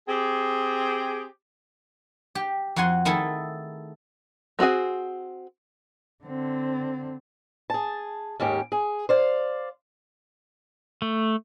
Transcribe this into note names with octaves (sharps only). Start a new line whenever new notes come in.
C4 G4 G#4
G4
F2 F#4 F#5 G#5 C6
D#3 A3 E4 G#4 A4
G#3 C4 F#4 G#4 G#5
D3 C4
G#4 A5
D#2 G#2 C#4 G4
G#4
C5 D5 F5
A3